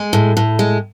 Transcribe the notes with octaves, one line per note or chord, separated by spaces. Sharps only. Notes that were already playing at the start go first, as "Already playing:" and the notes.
Already playing: G#3
A2
A2
G#3